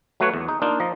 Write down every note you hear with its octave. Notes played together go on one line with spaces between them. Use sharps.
F#3 A3 F#4 B4 C#5 F#5
E2
D#4
A#3 D4 D#4 F4
F3 D#5 A#5